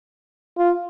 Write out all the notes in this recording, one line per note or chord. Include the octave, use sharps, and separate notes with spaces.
F4